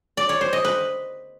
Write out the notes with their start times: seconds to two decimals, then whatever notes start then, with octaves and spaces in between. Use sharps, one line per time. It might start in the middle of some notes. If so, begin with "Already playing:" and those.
0.17 D5
0.29 C#5
0.41 C5
0.53 D#5
0.65 B4